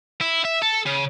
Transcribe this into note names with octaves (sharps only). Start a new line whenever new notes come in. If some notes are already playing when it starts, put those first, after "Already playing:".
E4
E5
A4
C#3